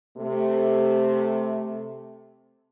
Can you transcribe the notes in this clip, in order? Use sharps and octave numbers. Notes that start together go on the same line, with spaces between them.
C3 A3